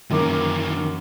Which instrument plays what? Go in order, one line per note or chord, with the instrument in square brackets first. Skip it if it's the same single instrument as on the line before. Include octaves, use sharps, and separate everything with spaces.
[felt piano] F#2 A#3 D6 [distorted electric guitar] D#3 E3